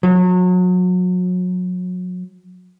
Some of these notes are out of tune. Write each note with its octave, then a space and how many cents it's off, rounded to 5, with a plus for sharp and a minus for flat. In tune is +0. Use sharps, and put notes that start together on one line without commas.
F#3 -30